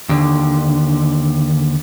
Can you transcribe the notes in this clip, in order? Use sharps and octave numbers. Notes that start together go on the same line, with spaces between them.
D#2 D3